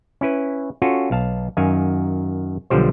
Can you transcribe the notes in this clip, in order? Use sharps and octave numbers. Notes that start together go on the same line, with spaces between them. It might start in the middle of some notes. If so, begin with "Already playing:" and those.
C#4 E4 B4
C#4 F4 F#4 A4
B1 F5 A5
F#2 D#3 F5 G#5
B1 D3 F3 G3 C5